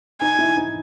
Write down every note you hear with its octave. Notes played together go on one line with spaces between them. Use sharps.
D#4 G#5
E4
D#4